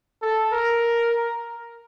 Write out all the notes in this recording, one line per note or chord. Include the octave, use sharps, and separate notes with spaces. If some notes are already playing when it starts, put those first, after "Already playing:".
A4
A#4